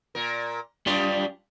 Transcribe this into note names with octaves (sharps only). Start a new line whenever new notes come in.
A#2 A#4
F#2 G3 D4 F4 D5